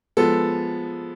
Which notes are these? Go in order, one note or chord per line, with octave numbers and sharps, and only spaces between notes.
F3 G#3 B3 A4